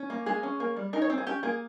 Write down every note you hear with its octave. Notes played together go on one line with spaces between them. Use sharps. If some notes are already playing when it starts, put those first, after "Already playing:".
Already playing: C#4
A#3
G#3 G#4
C#4
A#3
G3
D#4 A#4
C#5
C4
G#4
C#4 G4
A#3 G#4